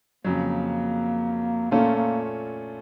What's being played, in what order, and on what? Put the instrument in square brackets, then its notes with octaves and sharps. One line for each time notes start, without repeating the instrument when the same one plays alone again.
[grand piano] F2 C#3 F#3 [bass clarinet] A#3
[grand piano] A#2 A3 C#4 F4 A4 [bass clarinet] A#3
[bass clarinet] A#3